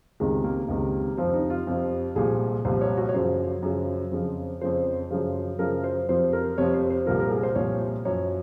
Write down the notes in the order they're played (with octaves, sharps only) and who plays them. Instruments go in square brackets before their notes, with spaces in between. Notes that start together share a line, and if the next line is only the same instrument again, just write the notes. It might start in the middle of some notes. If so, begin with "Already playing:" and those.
[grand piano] C#2 C3 D#3 G#3
A#3
C#2 C3 D#3
F2 C3 F3 C4
D#4
F4
F2 C3 F3
C2 A#2 F3 G#4
C2 A#2 F3 C5
C#5
F#4
C#5
F#2 C#3 F3 C5
F#2 C#3 F3
F2 C#3 F3
F2 C#3 F3 C5
F#2 C#3 F3
F#2 C#3 F3 A#4
C5
F2 C3 F3 C5
A#4
F2 C3 F3 C#5
C5
C5
C2 A#2 F3 A#4
A#4
G#4
C5
C2 A#2 F3 C#5
F#2 F3 C#5